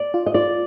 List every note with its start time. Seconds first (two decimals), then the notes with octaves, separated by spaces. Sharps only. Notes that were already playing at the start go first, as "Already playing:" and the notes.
Already playing: D5
0.14 F4
0.26 D#5
0.34 F4 D5